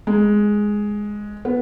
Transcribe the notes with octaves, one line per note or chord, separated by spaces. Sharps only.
G#3
B3